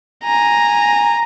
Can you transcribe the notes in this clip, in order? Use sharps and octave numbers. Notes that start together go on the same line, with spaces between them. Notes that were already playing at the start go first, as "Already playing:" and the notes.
G#5 A#5